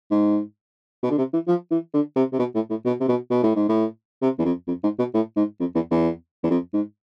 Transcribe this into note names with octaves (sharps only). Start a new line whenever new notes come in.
G#2
B2
D3
C3
E3
F3
E3
D3
C3
C3
B2
A2
A2
B2
C3
B2
B2
A2
G#2
A2
C3
E2
F2
F2
G#2
B2
A2
G#2
F2
E2
E2
E2
F2
G#2